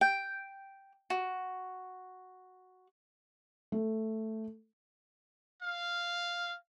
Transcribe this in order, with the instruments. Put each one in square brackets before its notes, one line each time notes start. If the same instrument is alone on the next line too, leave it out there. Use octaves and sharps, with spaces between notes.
[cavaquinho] G5
F#4
[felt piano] A3
[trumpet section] F5